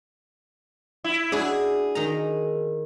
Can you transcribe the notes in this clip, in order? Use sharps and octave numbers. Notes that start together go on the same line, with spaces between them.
E4
D4 E4 F#4 G#4
D#3 A#5